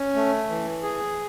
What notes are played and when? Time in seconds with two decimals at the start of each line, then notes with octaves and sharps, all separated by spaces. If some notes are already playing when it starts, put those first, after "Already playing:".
Already playing: C#4
0.15 A3
0.49 E3
0.83 G#4